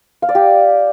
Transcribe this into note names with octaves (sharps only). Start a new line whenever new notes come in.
F5
D5
G4